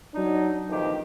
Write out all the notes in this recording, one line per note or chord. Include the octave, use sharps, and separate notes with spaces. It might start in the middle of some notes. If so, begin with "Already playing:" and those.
F#3 D4 D#4
A#1 F2 D#3 E3 G4